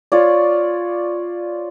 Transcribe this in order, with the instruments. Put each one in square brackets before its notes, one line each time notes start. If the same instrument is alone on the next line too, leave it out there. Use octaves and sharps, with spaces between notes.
[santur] F4 C#5 D5